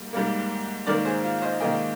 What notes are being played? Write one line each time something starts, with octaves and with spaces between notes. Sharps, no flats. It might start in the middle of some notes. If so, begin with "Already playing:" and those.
Already playing: G#2 G3 A#3
G#2 G3 A#3
G#2 D#3 A#3 A#4 D5
G#4 C5
F4
C5 D#5
G#2 D#3 A#3 D#5 G5